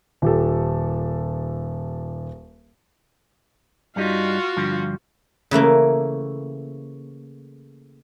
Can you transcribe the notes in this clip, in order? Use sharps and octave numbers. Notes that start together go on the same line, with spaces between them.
D#1 G4 A4
G2 G3 D#4 F4 F#4
G2 D3 F3
C#3 E3 A3 A#3